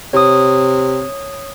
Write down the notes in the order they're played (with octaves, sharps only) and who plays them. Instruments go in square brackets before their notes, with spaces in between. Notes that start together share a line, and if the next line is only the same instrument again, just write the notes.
[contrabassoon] C3 [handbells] C#5 D#6